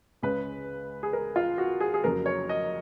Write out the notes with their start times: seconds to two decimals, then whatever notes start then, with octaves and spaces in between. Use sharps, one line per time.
0.22 C#2 C#3 G#3 C#4 B4
1.03 G#4
1.13 A#4
1.36 F4
1.58 F#4
1.81 G#4
1.94 G#4
2.04 F1 F2 C#3 F#3 A#3 A#4
2.26 C#5
2.49 D#5